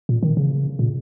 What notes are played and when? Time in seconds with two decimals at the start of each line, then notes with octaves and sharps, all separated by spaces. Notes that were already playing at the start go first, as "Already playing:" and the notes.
0.09 A#2
0.23 D#3
0.37 C#3
0.79 A#2